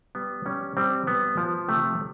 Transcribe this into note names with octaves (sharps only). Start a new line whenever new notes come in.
G3 B3
G3 C#4
G3 C4
G3 B3
F3
C3 A3